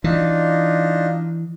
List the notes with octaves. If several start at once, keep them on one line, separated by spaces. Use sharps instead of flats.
E3 D4 D#4 F4